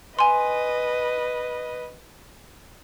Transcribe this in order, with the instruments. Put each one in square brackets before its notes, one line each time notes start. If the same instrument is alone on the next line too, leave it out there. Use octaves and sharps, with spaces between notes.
[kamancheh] B4 D#5 [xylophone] G#5 C6